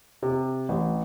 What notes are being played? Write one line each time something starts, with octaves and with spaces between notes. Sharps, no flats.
C3
A1